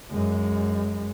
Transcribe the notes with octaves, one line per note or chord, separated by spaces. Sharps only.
F#2 G#3